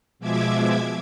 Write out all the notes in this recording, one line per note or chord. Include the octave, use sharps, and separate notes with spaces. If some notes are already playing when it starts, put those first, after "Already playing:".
B2 F3 G#3 E5 D6 G#6